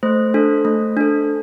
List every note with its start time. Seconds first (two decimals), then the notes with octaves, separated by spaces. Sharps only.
0.03 A3 C5
0.34 D4 A4
0.65 A3
0.97 D4 A4